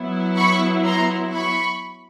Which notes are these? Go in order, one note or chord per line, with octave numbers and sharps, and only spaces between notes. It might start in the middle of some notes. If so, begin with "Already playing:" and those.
Already playing: F#3 B3 E4
B5 C#6
A#5 C6
B5 C#6